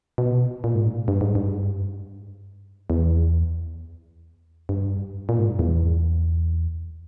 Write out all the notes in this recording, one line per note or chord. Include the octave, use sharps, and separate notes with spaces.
B2
A#2
G#2
A#2
G2
G#2
G2
E2
G2
A#2
G#2
G2
E2